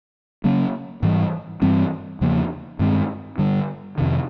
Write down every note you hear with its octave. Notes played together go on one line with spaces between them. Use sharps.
C#3 F#3 A#3 C#4
G#2 E3 G3
G2 E3 G3 C4
E2 C#3 F3 A#3
G2 D#3 G#3 C4
G2 D3 G3
F2 C3 D#3